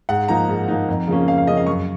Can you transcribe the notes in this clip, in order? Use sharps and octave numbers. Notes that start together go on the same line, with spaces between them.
G#2 F#5
F3 A#3 D#4 A#5
G#2
F3 A#3 D#4
F2
C#3 F3 A#3 C#4
F2 F5
F5
C#3 F3 A#3 C#4 D#5
F5
F#2 C#6